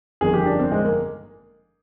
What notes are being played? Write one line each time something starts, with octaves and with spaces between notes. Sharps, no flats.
G1 F2 D#3 G#4
G4
D4
C4
G#3
A#3